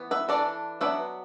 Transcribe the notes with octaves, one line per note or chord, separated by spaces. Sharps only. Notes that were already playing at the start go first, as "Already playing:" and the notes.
Already playing: E3 B3
B4 E5
E3 D4 A4 D5
F#3 B3 D4 B4 E5